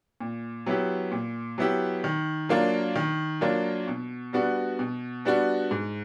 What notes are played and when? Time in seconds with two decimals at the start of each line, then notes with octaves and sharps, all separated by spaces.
0.21 A#2
0.66 F#3 B3 E4 G4
1.12 A#2
1.58 F#3 B3 E4 G4
2.04 D#3
2.49 F#3 A#3 D4 F4
2.96 D#3
3.41 F#3 A#3 D4 F4
3.88 B2
4.33 G3 B3 D4 F#4
4.79 B2
5.25 G3 B3 D4 F#4
5.71 G#2